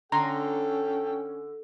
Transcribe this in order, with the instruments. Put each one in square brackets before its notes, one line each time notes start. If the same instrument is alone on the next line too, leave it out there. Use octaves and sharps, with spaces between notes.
[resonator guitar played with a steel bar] D3 [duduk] C#4 [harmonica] A4 G5 [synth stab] A#5 C6